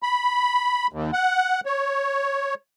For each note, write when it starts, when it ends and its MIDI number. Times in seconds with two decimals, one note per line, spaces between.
0.03 0.87 83
0.93 1.11 39
1.13 1.61 78
1.66 2.54 73